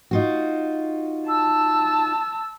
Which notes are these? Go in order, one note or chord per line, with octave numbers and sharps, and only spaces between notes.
D#4 F4 F#4
A5 E6